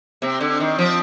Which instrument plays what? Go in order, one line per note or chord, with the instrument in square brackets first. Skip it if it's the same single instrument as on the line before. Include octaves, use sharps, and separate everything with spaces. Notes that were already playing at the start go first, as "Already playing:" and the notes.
[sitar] C3 [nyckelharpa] C4
[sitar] D3
D#3
F3